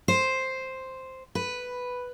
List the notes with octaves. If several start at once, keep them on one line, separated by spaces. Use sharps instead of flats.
C5
B4